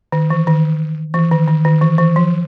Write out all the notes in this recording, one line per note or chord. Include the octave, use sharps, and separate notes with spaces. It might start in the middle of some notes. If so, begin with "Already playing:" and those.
D#3
E3
D#3
E3
D#3
D#3
D#3
E3
E3
F3